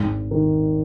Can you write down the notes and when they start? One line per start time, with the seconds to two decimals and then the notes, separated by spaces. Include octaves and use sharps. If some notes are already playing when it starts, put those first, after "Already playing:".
Already playing: G#1
0.31 D#3